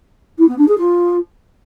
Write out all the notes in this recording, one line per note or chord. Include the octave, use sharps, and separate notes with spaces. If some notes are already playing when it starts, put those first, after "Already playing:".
E4
B3
D4
G#4
F4